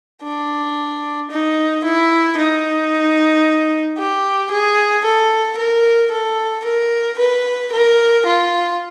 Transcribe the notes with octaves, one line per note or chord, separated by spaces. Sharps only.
D4
D#4
E4
D#4
G4
G#4
A4
A#4
A4
A#4
B4
A#4
F4